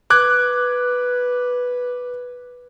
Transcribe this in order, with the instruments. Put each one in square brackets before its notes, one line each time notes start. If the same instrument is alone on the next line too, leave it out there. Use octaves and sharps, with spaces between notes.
[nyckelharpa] B4 [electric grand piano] D6 F#6 G#6